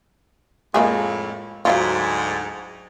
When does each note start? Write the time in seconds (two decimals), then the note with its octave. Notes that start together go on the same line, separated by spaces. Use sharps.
0.74 F2 A2 G#3 A#3 G#4
1.65 D2 G#2 F#3 E4 F4